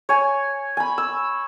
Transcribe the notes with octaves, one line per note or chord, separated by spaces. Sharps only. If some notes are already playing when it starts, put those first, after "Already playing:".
C#5 G#5
G#5 B5
E6